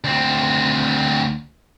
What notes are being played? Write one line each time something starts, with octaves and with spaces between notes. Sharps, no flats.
D2 C4